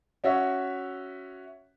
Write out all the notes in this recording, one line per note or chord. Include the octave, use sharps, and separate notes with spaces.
C#4 F#4 C#5 E5